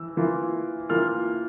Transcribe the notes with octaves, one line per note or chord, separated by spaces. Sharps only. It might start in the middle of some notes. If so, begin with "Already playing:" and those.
Already playing: E3 E6
E3 A#3 F4
E3 A#3 F4 F6